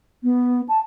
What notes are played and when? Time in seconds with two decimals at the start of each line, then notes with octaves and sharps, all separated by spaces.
0.24 B3
0.69 A5